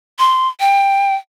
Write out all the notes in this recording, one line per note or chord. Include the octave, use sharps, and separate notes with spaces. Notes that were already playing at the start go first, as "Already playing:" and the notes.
C6
G5